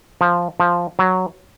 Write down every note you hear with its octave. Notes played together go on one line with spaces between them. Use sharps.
F3
F3
F#3